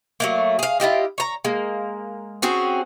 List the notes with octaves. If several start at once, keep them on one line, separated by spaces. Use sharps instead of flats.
F#3 A3 A#3
G#4 F5
E4 F4 G4 D#5
C#5 A#5
G#3 A#3
C4 C#4 F#4 G#4